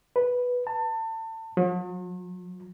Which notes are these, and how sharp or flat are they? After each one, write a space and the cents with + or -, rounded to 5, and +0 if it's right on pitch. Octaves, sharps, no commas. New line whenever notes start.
B4 -5
A5 +30
F#3 -45